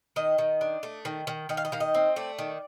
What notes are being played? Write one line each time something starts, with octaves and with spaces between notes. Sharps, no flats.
D#3 D#5
D#3
D4
A3
D#3
D#3
D#3 D#5
F5
D#5
D#3 F5
D#5
C4
A3 D5
D#3